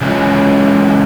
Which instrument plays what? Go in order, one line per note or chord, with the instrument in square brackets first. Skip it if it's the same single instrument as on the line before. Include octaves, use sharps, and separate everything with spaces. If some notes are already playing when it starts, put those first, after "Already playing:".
[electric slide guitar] C#3 E3 G#3 F4